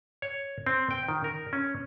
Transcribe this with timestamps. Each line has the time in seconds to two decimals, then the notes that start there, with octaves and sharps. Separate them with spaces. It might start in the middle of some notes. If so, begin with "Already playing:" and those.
0.22 C#5
0.66 C4
0.91 G5
1.08 D#3
1.24 A#4
1.53 C#4